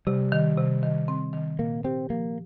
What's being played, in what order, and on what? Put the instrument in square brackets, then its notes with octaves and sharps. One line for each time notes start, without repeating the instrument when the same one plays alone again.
[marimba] C3 [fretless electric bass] G3
[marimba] D#3
C3
D#3
C4
D#3
[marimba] A#2 [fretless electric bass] A#3
[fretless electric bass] C4 [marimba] G4
[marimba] F3 [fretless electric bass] A#3